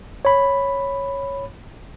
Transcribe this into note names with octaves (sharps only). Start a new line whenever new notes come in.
C#5 B5